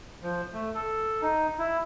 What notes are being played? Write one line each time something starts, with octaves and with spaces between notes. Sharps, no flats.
F3
A3
A4
D#4
E4